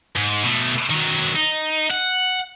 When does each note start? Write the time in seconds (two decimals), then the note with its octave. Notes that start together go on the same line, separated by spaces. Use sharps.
0.16 G#2
0.43 B2 A3
0.90 D#3 F#3
1.36 D#4
1.91 F#5